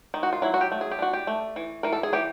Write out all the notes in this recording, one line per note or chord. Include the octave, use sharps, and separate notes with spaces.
D#3
F#4
F4
F#3 E4
F#4
G4
A3
G#4
G4
D4 F#4
G4
A3
E3
E3 A#4
A4
G#4
E3 G4